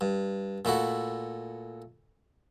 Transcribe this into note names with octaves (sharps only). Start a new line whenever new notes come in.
G2
A#2 A3 E4 F#4